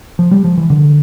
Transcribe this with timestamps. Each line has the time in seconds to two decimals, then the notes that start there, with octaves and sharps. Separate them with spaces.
0.19 F3
0.31 G3
0.44 F3
0.58 E3
0.70 D3